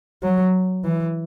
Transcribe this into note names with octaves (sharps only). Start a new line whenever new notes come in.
F#3
E3